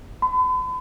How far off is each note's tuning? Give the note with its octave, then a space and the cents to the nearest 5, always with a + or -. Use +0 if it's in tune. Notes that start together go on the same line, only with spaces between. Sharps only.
B5 +40